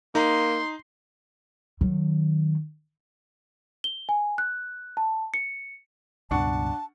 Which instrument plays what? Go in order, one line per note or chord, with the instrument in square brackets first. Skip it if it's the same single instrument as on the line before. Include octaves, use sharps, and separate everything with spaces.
[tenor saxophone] A#3 [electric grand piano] D#4 [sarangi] C6
[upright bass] D#3 F#3
[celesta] G7
G#5
F#6
A5
C#7
[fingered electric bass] C#2 G2 B2 [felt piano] D4 F#5 C#6 [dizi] A5